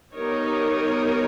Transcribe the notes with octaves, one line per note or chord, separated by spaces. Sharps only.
G3 B3 D#4 A#4 C#5